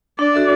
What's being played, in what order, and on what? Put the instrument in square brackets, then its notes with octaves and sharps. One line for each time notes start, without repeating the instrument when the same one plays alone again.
[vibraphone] D4 [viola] D5
[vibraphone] F#4 A4 E5